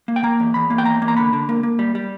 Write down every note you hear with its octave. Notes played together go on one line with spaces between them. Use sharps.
A#3
G5
A#3 A#5
E2
E2 B5
A#3
G5
E2 A#5
A#3
A#5
D3 B5
D3
A#3
A#3
G3
G3